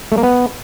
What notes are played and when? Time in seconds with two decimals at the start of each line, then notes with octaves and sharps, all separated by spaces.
0.12 A3
0.18 A#3
0.23 B3